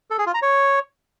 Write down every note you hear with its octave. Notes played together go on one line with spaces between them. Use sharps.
A4
G#4
F4
A#5
C#5